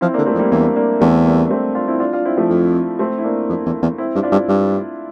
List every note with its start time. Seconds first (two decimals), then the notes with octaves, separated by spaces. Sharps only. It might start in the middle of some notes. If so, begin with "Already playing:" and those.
0.01 F3 C4 E4
0.14 D3 A#3 D4
0.26 A3 C4
0.35 F2
0.39 G3 A#3
0.51 E2 A#3 D4
0.76 A#3 D4
1.01 E2 A3 C4
1.25 G3 A#3
1.45 D4
1.51 A3 C4
1.75 D4 F4
1.88 C4 E4
2.00 D4 F4
2.13 D4 F4
2.25 C4 E4
2.37 F3 A3
2.50 F2
2.99 A3 C4
3.19 E4
3.24 A#3 D4
3.49 F2
3.66 E2
3.82 E2
3.98 C4 E4
4.15 G2
4.23 D4 F4
4.32 G2
4.48 G2